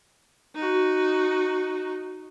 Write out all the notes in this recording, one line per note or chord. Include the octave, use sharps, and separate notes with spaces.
D#4 F#4